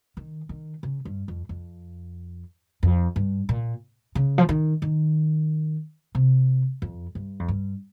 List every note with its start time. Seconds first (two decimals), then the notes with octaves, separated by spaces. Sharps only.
0.17 D#3
0.49 D#3
0.83 C#3
1.05 G2
1.28 F2
1.49 F2
2.83 F2
3.16 G2
3.49 A#2
4.15 C#3
4.38 F3
4.49 D#3
4.82 D#3
6.15 C3
6.82 F2
7.15 G2
7.39 F2
7.48 G2